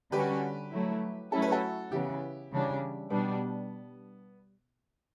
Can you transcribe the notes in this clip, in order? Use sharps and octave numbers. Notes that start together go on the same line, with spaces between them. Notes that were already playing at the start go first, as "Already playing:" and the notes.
D3 G3 C#4 F#4 G4 B4
F#3 A3 E4
F#3 A3 C#4 E4 A4
B4
F#4 A4
C#3 E3 B3 E4 G4
C#3 E3 G3 D4
B2 G3 B3 D4